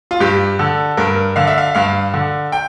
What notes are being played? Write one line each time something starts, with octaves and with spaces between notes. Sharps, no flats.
F4
G2 G4
D3 A4
G2 A#4
D3 F5
E5
F5
G2 F5
D3
G5